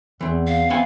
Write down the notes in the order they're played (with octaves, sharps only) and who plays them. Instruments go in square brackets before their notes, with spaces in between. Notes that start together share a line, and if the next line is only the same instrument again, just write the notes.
[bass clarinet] E2 [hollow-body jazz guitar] E3 C4
[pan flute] F5
[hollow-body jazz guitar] E2 B3 G#5 [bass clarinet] C4